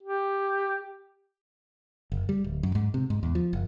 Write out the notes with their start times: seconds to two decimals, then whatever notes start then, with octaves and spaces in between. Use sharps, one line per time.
0.03 G4
2.12 F#1
2.29 G3
2.44 D1
2.63 F#2
2.75 G#2
2.94 C3
3.10 G#2
3.23 E2
3.35 F3
3.53 F#1